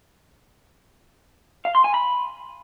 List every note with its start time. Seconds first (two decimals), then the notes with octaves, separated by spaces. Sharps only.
1.65 F5
1.75 C6
1.84 G#5
1.94 B5